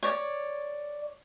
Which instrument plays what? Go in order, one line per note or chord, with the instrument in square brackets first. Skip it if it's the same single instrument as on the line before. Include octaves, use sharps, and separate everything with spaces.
[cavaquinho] C#5 D5